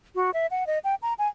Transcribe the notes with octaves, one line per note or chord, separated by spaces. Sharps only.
F#4
E5
F#5
D#5
G5
A#5
G#5